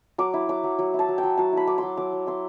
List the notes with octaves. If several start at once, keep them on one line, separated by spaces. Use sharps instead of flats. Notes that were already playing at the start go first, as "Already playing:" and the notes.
F#3 D6
E4
F#3 D6
F#3
F#3
E4 A5
F#3
G5
F#3
F#3 A5
E4 B5
E4 D6
F#3 C6
F#3 D6
F#3
E4 C6